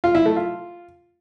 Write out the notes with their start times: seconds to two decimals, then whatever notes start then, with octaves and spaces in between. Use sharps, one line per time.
0.04 F4
0.15 E4
0.26 A3
0.36 F4